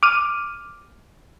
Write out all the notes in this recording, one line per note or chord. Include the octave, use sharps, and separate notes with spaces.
D6 F6 D#7